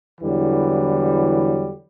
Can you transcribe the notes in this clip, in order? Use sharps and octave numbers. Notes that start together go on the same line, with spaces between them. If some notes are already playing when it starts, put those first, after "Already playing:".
E2 D3 E3 F#3 G3